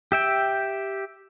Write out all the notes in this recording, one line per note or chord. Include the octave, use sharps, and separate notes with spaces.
G4 E5 G5